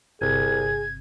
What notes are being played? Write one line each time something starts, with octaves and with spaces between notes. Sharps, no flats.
G1 C2 C3 G#4 G#6